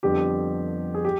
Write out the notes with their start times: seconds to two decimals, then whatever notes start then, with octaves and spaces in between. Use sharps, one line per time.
0.03 F2 D3 G3 B3 G4
0.94 G#4
1.05 G4